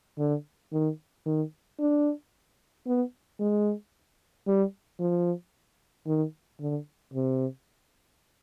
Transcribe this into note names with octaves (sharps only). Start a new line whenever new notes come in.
D3
D#3
D#3
D4
B3
G#3
G3
F3
D#3
D3
C3